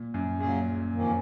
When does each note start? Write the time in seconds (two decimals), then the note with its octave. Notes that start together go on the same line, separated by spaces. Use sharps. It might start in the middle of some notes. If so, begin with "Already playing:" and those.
Already playing: A#2
0.14 F#2
0.40 A#2 C#3 F#3 C#4 G#4
0.76 A#2
0.93 F2 D#3 A#3 C#4